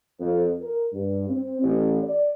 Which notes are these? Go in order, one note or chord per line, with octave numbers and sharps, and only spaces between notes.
F2
A#4
G2
C4
A1
D5